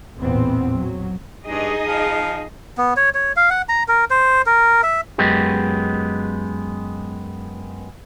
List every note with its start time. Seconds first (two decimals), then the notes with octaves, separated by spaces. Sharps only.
0.20 A1 E2 A#2 B3 C4
0.73 F#3
1.47 G2 D#4 G#4 D#5
1.84 F3
2.78 B3
2.97 C#5
3.15 C#5
3.36 F5
3.50 F#5
3.69 A#5
3.88 A#4
4.10 C5
4.46 A#4
4.83 E5
5.18 F#2 G#3 B3 G4